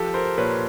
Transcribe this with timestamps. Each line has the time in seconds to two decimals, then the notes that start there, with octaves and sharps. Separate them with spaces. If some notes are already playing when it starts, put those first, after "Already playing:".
Already playing: F3 G4 A4
0.14 A#4 C5
0.38 A#2 B4 C#5